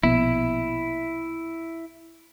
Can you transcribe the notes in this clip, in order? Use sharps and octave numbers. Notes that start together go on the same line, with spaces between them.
A#1 B2 B3 E4